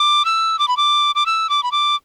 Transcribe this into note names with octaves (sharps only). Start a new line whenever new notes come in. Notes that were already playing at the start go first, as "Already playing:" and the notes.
Already playing: D6
E6
D6
B5
D6
D6
E6
D6
B5
D6